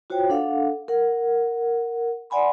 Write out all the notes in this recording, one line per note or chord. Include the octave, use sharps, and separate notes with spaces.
F4 F#4 C5 C#5 G5
D4 A4 F5 F#5
A#4 F#5
D5 F#5 G#5 B5 C6